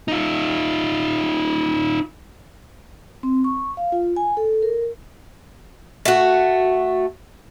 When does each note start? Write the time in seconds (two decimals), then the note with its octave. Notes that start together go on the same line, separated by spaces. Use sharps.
0.08 D#4 F4
3.23 C4
3.44 C#6
3.77 F5
3.92 F4
4.16 G#5
4.37 A4
4.63 A#4
6.05 A3 F#4